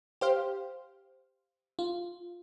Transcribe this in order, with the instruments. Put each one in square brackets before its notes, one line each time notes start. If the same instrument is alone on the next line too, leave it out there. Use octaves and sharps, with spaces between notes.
[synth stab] G4 C5 F5
[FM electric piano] F4